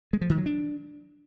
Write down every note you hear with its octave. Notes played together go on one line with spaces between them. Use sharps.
G#3
F3
D#3
F#3
D4